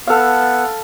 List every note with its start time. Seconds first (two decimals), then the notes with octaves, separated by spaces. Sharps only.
0.07 B3 A4 F5